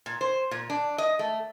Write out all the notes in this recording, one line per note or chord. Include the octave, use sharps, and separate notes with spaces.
A#2
C5
A#2
D4
D#5
A3